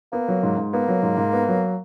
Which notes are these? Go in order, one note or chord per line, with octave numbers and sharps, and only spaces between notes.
A#3 B3
F#3
G#2
G#2
A#3 B3
F#3
G#2
G#2
B3
F#3